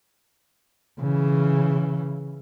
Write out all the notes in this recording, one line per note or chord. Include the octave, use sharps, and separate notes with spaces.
C#3 E3